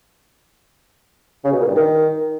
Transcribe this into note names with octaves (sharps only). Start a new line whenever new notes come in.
C#3
B2
A#2
G2
D#3